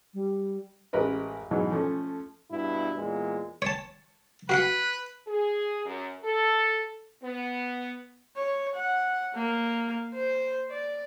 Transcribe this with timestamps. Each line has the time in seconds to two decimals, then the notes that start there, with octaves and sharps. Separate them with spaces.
0.14 G3
0.93 A1 G#3 A#4 B4 D#5
1.51 G#2 B2 E3 F#3
1.71 F3 A3 C#4
2.51 G2 B2 E4
2.97 E2 A#2 G#3
3.62 C#5 A5
4.49 F#4 B4 F5 F#5
5.27 G#4
5.86 F#2
6.24 A4
7.23 B3
8.36 C#5
8.75 F#5
9.35 A#3
10.14 C5
10.70 D5